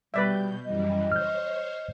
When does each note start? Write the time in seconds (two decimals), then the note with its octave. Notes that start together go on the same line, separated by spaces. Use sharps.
0.14 B2 G3 B4 D5 E5 G6
0.64 F#2 E3 G3 D#5
1.12 C5 C#5 F6 G6